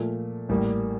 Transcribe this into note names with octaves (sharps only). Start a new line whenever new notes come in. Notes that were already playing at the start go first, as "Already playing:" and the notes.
Already playing: A#2 F3 A3
A1 A2 G3 A#3